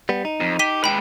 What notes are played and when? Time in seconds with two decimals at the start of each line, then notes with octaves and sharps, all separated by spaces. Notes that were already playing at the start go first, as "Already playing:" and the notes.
0.09 G3 B3
0.25 D#4
0.40 F2
0.59 G4 B6 D#7 G7
0.84 G#3 B4 G5 B5